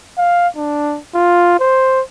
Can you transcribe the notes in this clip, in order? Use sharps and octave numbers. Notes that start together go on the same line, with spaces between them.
F5
D4
F4
C5